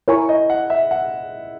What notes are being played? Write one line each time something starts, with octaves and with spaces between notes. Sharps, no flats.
E4 A#4 C#5 G#5 C#6
D#5
F#5
E5
F#5